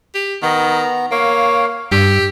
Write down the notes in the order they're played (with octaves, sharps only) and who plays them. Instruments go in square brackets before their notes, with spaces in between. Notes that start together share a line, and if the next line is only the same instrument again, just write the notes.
[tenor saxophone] G4
[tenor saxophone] D#3 [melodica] B3 A#5
[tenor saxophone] A#3 [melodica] C#5 F5
[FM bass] G2 [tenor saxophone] G4 [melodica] E6